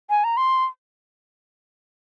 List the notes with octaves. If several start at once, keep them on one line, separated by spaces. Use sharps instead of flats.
G#5
A#5
C6